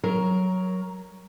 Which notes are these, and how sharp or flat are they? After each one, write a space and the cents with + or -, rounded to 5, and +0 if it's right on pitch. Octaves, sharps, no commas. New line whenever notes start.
F#3 +0 A#4 +10